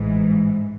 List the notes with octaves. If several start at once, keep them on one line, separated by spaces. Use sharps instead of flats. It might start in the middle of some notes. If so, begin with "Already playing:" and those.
Already playing: A1 G#2 E3